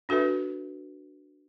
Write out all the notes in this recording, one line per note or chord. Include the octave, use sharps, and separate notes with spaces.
D4 F#4 A4 B4 E5